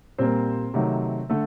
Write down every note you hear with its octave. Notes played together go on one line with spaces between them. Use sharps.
A#2 G3 A#3 C4 C5
C3 D#3 F#3 A3
D3 A3 A4